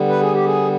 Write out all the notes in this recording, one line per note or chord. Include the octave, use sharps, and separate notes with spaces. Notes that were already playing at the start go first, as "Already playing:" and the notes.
Already playing: D3 G3 B3
B4
G#4
G4
G#4